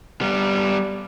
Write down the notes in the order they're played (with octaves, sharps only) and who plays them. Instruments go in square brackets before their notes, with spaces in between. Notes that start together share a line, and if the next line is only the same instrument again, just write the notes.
[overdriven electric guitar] G3 B3